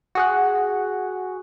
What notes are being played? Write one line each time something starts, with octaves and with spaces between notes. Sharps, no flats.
F#4 G#4 F#5